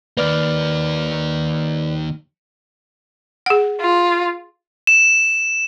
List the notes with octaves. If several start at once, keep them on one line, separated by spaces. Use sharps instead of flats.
D#3 A#3 B4 D5 F6
G#4 F#5
F4
E7